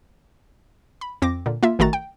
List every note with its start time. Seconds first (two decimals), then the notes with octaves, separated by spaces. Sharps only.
1.01 B5
1.22 F2 C4 D6 A#6
1.46 A#2 D3
1.63 A#3 F4 E5
1.79 A1 D#3 A3 F#4 A#5 A6
1.93 G5